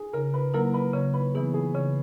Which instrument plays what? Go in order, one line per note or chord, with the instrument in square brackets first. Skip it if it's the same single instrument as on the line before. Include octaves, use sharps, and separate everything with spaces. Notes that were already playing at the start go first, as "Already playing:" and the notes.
Already playing: [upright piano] G#4
[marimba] C#3 [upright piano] A#4
[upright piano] B4
[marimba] F#3 A#3 E4 [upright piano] A#4
[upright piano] B4
[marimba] C#3 [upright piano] C#5
[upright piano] B4
[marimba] E3 B3 E4 [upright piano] G#4
[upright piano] G#4
[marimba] C#3 [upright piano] C#5